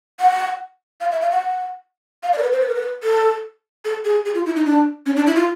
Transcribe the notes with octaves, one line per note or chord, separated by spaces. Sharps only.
F#5
F5
E5
F5
F#5
F5
D5
A#4
B4
C5
B4
A#4
B4
A4
A4
G#4
G#4
F4
E4
D#4
D4
C#4
D4
E4
F4